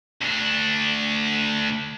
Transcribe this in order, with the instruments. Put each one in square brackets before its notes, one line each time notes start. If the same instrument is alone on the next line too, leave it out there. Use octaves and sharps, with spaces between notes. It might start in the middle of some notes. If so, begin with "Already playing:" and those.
[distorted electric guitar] D2 D4